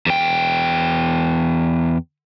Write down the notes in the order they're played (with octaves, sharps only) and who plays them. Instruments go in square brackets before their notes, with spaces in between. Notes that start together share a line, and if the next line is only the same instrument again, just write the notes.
[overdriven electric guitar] E2 G5